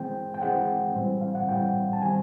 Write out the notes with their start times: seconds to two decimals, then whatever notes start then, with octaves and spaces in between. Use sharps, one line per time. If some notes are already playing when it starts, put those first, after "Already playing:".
Already playing: E3 G#3 C4 G5
0.34 G5
0.41 E3 G#3 C4 F#5
0.95 A2 E3 G3 C4
1.21 F5
1.35 F#5
1.48 A2 E3 G3 C4 G5
1.93 A5
2.02 D#3 G3 C4 G#5